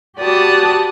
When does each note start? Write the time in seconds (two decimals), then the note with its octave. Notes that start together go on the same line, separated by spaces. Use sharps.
0.18 F#4 G4 B4 D5 A5 D#6